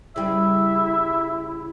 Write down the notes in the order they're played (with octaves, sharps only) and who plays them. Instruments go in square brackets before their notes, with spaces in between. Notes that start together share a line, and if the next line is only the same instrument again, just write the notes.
[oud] C#3 G3 [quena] E4 [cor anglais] E5